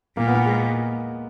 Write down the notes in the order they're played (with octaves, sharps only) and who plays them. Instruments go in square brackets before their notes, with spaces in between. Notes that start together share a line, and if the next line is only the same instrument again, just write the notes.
[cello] A#2 [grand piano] A#3
[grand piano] B3
A#3
G#3